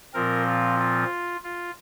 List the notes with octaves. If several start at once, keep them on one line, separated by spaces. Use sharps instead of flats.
A#2 F3 C4 A#4
F4
F4
F4